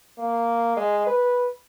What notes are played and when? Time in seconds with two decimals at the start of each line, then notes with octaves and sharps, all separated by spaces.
0.18 A#3
0.77 G#3
1.07 B4